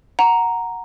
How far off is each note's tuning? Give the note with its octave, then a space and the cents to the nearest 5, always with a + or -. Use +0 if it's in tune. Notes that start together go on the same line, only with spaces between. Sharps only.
F#5 -5 A#5 +0